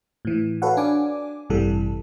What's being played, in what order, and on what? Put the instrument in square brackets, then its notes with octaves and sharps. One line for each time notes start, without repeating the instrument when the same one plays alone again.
[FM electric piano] A2 E3
F#4 A4 B4 C#5 F5 F#5
D4 G#5 D6
A1 G2 C3 E3 G3 A4